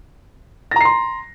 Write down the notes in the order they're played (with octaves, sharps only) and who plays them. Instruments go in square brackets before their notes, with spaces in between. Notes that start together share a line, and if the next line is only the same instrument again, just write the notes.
[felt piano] A#6
A#5
C7
C6